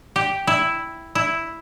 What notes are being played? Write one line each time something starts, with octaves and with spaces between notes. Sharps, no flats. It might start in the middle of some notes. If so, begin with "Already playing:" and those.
G4
E4
E4